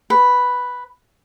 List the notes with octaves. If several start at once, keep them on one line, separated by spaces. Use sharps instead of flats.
B4